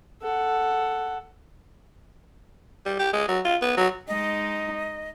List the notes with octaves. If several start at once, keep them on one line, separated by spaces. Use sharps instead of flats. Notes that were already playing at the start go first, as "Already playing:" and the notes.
A4 F#5
G3
G4
G#3
F#3
F4
B3
F#3
G#3 D#4 D#5